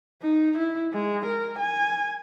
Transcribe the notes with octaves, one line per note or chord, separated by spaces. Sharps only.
D#4
E4
G#3
A#4
G#5